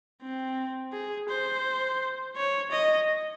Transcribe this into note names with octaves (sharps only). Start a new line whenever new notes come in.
C4
G#4
C5
C#5
D#5